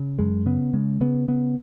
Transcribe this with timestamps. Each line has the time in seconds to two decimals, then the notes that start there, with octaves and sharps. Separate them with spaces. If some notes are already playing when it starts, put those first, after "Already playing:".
Already playing: C#3
0.19 F#2 G#3
0.46 C#3 B3
0.74 C#3 G#3
1.01 C#3 B3
1.28 C#3 B3